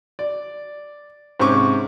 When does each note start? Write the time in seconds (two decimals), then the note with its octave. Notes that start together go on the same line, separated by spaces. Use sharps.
0.19 D5
1.40 G#2 C3 C4 C#4 C#6 D6